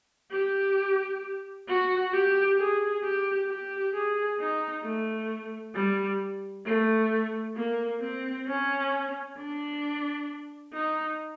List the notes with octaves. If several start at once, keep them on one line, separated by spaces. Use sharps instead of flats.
G4
F#4
G4
G#4
G4
G4
G#4
D#4
A3
G3
A3
A#3
C4
C#4
D4
D#4